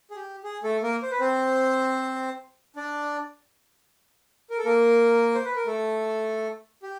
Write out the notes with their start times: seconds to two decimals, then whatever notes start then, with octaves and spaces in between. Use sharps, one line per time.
0.11 G#4
0.16 G4
0.44 G#4
0.63 A3 A4
0.83 A#3 A#4
1.02 C5
1.11 B4
1.20 C4 C5
2.76 D4 D5
4.50 A#4
4.58 A4
4.65 A#3 A#4
5.35 C5
5.45 B4
5.56 A#4
5.66 A3 A4
6.83 G4